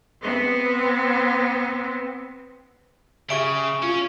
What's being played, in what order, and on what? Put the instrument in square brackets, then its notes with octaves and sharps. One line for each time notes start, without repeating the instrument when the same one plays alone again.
[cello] B3 C4
[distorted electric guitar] C#3 [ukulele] G4 G#4 E5 [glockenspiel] C#6 D7
[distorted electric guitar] C#4 [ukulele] F4